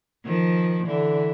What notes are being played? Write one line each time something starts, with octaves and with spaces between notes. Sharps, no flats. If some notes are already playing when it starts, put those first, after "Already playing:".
D#3 F3
D3 E3